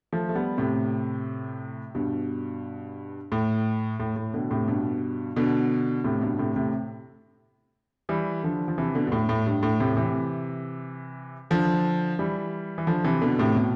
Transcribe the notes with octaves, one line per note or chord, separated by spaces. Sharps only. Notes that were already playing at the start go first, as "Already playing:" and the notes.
F3 A3
A3
G3 B3
A2 C3
G2 B2
A2
A2
A2
B2 D3
A2 C3
G2 B2
B2 D3
A2 C3
G2 B2
A2 C3
A2 C3
E3 G3
D3 F3
F3
C3 E3
B2 D3
G2
A2
A2
G2
A2
A2 C3
C3 E3
D3 F3
E3 G3
E3
D3 F3
C3 E3
B2 D3
A2 C3
B2